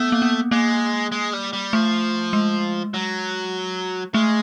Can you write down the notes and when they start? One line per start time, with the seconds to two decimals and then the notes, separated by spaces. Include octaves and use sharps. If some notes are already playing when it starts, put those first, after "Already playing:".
Already playing: A3 B3
0.12 A#3
0.22 B3
0.51 G#3 A#3
1.12 G#3
1.33 G3
1.53 G3
1.73 F3 A3
2.33 G#3
2.94 F#3
4.14 G#3 A3